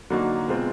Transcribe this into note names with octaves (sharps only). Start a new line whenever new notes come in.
D3 F#3 A#3 D#4 F#4
B2 G#3 C4 F4